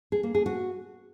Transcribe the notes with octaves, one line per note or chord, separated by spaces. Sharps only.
G#4
A#3
G#4
F#4